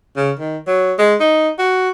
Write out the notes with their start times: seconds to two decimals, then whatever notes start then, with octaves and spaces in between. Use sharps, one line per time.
0.16 C#3
0.39 D#3
0.67 F#3
0.99 G#3
1.20 D#4
1.58 F#4